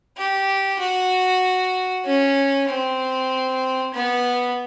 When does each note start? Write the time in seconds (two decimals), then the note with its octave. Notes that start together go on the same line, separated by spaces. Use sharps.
0.18 G4
0.80 F#4
2.06 C#4
2.69 C4
3.94 B3